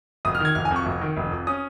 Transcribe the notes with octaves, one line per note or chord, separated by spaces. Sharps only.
F1 D#6
F6
D#3 G#6
F1 F6
G#5
F2
C#6
F1
D#3
F1
F2
C#4 D#6